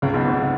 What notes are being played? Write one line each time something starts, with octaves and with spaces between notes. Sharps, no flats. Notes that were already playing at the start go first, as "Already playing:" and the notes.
C#2 C#3
B1 B2
G#2